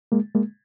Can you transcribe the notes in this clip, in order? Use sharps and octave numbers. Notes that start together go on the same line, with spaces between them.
G#3 A#3
G#3 A#3